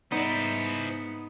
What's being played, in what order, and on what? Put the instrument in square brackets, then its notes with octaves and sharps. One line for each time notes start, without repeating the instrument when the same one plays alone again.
[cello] G#2 [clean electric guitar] B3 [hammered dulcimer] D#4 [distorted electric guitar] E4 C5